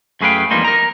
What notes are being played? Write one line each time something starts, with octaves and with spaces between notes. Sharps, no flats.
F#2 A3 G#4 B4 F5 G5
F2 E3 G3 A#3 D#4 C5
A#4 A#5